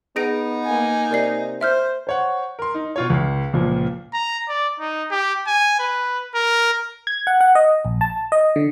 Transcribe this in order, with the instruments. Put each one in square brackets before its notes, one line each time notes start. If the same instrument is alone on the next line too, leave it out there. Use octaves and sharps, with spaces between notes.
[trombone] B3 [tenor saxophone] D#4 [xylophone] G#4 A#6 D7
[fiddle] A#3 G#5
[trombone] C3 [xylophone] A#4 D5 C7
[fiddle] C5 [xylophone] E5 F6 G6
[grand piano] C5 C#5 F#5
A#4 C6
D#4
B2 F4 C#5
C#2
C#2 A#2 F3
[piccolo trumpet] A#5
D5
D#4
G4
G#5
B4
A#4
[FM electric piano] G#6
F#5
F#5
D#5
A#1
A5
D#5
D3